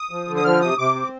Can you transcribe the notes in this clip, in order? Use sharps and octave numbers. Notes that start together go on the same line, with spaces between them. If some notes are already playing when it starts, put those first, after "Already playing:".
Already playing: D#6
F3
D3
D#6
F3 F6
C3 D#6
C3 D6
C4